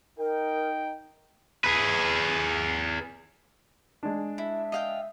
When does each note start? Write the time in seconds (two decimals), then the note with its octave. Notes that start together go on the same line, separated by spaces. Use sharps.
0.18 D#4 A#4 G5
1.64 G#4 B4
4.03 G#3 D4
4.38 E4 E5
4.72 D#5 F5 G5